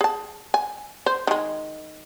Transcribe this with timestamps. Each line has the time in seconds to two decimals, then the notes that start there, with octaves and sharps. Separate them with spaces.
0.01 G#4 A5
0.54 G#5
1.06 C5
1.27 D#3 G#3